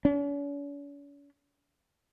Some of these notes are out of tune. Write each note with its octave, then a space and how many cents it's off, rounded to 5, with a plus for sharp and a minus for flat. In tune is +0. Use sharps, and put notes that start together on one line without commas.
C#4 +45